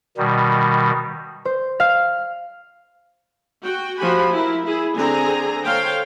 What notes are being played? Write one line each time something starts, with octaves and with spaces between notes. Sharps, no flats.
B2 D#3 G3
C5
F5
F#4 G5
F3 F#4 G4 G#5 B5
E4 A#4
E4 G#4
D3 C4 G#4 G#5 A#5
A4 C5 C#5 F5 G5